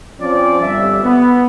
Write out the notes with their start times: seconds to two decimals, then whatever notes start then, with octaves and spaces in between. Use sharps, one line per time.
0.20 F3 C4 C#4 D5
0.60 G1 G3 E5
1.02 B3